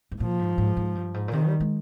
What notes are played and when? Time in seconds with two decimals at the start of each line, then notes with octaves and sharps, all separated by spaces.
0.11 G#2
0.20 A#2 F3
0.39 G#2
0.58 G#2
0.77 G#2
0.95 G2
1.14 G#2
1.28 A#2
1.33 C3 D#3
1.47 G3
1.60 G#3